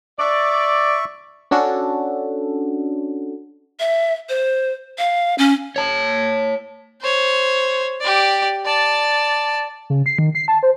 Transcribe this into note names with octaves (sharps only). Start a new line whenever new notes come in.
D5 E5 C#6
C#4 D4 F#4 A4
E5
C5
F5
C#4
C#5 A5
C5 C#5
G4 D5
D5 A5
C#3
C7
D#3
C7
A5
C5